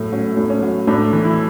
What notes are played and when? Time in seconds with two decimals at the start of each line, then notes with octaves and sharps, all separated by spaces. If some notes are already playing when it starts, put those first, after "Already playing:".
Already playing: A2 F#3
0.12 F#3 C#4
0.37 A2
0.50 C#4
0.62 F#3
0.87 A2 D4
1.13 E3
1.25 E4